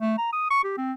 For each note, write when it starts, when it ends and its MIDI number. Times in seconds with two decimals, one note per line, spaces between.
0.01 0.16 57
0.17 0.28 82
0.32 0.47 87
0.51 0.63 85
0.64 0.76 67
0.77 0.92 60